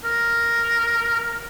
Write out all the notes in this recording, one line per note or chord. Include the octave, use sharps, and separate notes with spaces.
A#4